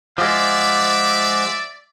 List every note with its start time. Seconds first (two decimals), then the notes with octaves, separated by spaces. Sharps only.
0.18 F3 G#3 C5 D5 E5 F#5 D6